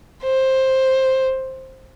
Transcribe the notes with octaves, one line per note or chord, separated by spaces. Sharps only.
C5